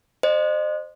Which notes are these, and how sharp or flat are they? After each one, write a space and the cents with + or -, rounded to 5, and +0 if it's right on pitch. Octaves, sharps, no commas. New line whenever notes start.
C5 +0 D#5 -35